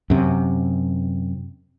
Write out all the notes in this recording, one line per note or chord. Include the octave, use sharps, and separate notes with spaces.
F#2 C3